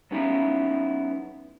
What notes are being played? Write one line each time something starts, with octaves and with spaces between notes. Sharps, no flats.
F#3 B3 C#4 D#4 E4 F5